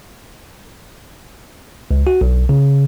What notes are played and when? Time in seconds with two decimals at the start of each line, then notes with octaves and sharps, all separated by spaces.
1.91 C#2
2.07 F#4
2.21 B1
2.49 C#3